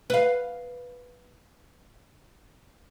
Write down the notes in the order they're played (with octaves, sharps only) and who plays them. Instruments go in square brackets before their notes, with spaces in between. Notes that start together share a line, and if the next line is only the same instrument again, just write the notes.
[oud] B4 F5